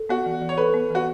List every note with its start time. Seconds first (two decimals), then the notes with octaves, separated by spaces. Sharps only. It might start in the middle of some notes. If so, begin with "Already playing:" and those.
Already playing: A4
0.09 B3 F#4
0.26 E3
0.42 E3
0.49 C#5
0.57 A4 B4
0.74 B3
0.90 E3 F#4